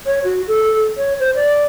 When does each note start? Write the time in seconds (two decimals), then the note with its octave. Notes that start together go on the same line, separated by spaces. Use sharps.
0.06 C#5
0.24 F#4
0.48 A4
0.97 C#5
1.20 C5
1.35 D5